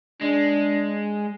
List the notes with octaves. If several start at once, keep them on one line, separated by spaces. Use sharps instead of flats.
G#3 D4